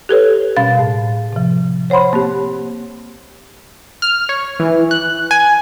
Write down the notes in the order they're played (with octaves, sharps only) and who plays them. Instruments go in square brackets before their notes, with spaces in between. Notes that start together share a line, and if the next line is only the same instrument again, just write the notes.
[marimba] G4 A4 B4 C#5
B2 G3 C#4 F5 A6
A2
C3 F3
C5 C#5 F#5 B5 C6
A#3 C4 G4
[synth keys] F6
C#5
E3
F#6
G#5